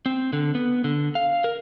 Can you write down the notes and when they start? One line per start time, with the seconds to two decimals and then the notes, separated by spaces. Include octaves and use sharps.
0.06 C4
0.33 D3
0.55 B3
0.84 D3
1.15 F5
1.44 A#4